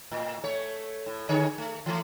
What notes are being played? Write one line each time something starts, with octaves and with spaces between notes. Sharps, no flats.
A2
A3 C#5
A2
D3 G#4 C#5
A3
E3 A3